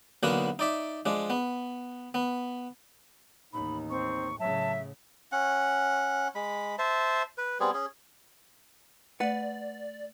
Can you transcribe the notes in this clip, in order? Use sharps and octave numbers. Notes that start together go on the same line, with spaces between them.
B1 D3 A#3 B3 F#4 D#6
D#4 D5 E5
F3 G#3 D4
B3
B3
A1 D#2 D#4 B5
C4 C#6
A2 C#3 F#3 E5 A5
C#4 F#5
G#3 B5
C5 E5 A5
B4
G3 B3 C4 G#4
C#4 G#4
A3 B4 D5 F#5